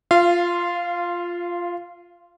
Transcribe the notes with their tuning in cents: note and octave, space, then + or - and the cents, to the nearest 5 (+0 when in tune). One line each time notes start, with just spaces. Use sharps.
F4 +0 F5 -25